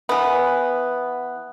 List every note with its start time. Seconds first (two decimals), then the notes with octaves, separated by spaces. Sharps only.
0.09 E3 B3